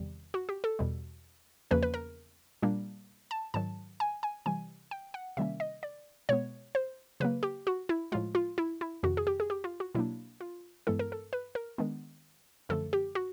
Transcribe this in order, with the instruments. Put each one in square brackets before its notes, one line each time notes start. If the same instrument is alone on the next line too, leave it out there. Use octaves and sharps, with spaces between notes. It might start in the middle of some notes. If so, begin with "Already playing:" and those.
Already playing: [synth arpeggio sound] E2 C3 D#3 G3
F#4
G4
A4
E2 B2 G3
E2 C#3 F3 A#3 C#4 B4
B4
A#4
A#2 G3 A#3 D4
A5
G#2 D#3 F#3 A5
G#5
G#5
C3 E3 G3 G#5
G5
F#5
C3 D#3 G3 A#3 C#4 E5
D#5
D5
B2 G#3 B3 C#5
C5
C#3 F#3 A#3 B4
G4
F#4
E4
A2 F3 G#3 F4
F4
E4
E4
F2 C3 D#3 F#4
G#4
G4
G#4
G4
F4
F#4
B2 F#3 A#3 D4 E4
F4
G2 E3 G#3 B3 E4 A4
A#4
A4
B4
A#4
D#3 G#3 B3 D4
F#2 D3 F3 A3 A4
G4
F#4